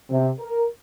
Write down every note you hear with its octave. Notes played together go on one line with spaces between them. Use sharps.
C3
A#4